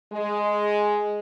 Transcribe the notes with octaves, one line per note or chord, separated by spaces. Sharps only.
G#3